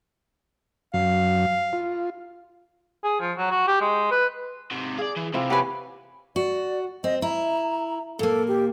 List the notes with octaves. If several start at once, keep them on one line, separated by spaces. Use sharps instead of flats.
F#2 F5
F4
G#4
F3
F#3
F#4
G4
G#3
B4
G#2 C3
G#4 D5 F5
E3
C3 C4 E4 F4
C#4 G4 B4 G#5
F#4 D5
C4 D#5
E4 A#5
A#2 A#3 A4
G4